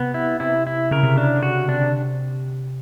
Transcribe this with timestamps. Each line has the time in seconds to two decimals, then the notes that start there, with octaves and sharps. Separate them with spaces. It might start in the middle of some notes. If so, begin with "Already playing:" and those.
Already playing: C3 B3
0.14 E4
0.40 C3 E4
0.67 E4
0.91 C#3 A#4
1.03 C3
1.15 C#3 D4
1.36 D3
1.43 C#3 F#4
1.55 C#3
1.68 C3 D4
1.82 C3